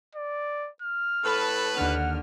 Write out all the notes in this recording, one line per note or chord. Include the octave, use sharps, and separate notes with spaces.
D5
F6
A2 A4 B4
D#2 D3 F#5 F6